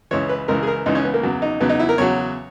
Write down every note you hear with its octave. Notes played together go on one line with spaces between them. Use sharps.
C#2 C#3 E3 C#5
B4
C#2 C#3 E3 A#4
G#4
A#4
C#2 C#3 E3 D#4
C#4
B3
A#3
E2 C#3 F#3
D#4
E2 C#3 F#3 B3
D#4
E4
A#4
E2 C#3 F#3 C#5